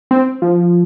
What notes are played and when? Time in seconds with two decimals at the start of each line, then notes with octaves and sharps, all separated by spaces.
0.11 C4
0.42 F3